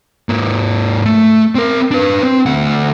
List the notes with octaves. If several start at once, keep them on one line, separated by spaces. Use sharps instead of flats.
G#2 A#3
A3
C4 A#4
D4 B4
C4
D2 F#5